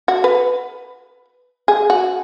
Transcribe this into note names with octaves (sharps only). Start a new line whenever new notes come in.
F#4
B4
G#4
F#4